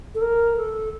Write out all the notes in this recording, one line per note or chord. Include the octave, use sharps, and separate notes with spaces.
A4
A#4
A4